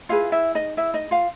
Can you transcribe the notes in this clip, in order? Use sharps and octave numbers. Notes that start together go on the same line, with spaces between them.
E4 F4 G#4 B4 F5
E4 E5
D#4 D#5
E4 E5
D#4 D#5
F4 F5